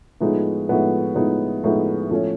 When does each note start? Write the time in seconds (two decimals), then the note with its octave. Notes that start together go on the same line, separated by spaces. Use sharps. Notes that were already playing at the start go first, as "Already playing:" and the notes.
0.21 A2 F3 G#3 B3 D#4
0.69 A2 F3 G#3 B3 D#4
1.15 A2 F3 G#3 B3 D#4
1.64 A2 F3 G#3 B3 D#4
2.11 A2 F3 A3 C#4